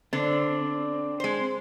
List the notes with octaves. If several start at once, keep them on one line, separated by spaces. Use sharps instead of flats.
D3 C4 D4
G#3 C5